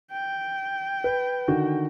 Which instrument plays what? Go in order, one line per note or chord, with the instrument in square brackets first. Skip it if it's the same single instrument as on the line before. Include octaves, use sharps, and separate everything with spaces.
[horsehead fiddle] G5
[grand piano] B4
D3 D#3 F#4